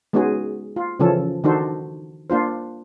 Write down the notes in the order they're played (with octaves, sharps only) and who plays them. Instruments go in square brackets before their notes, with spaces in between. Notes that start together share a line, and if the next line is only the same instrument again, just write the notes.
[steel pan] G#3 B3 C#4 D#4 F#4 G#4
F4
C#3 E3 F3 C#4 A4
D#3 D4 D#4 F#4 A4 C5
A#3 D4 F4 C5